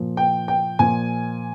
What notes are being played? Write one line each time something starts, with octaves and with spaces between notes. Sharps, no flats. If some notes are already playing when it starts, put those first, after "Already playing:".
Already playing: A#2 F3
G5
G5
A#2 F3 G#5